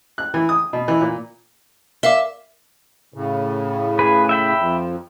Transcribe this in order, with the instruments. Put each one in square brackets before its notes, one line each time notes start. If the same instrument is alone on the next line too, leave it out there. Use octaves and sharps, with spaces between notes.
[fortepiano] F#6
E3
D#6
B2
E3
A#2
[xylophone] A#4 F5 D6 [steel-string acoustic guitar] E5
[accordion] A2 C#3
[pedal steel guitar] G#4 B4
E5 G5 B5
[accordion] F2